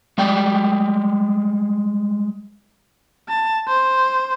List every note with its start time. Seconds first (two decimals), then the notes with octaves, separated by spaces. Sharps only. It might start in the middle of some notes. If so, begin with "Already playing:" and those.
0.18 G3 G#3 D5 G5
3.29 A5
3.68 C5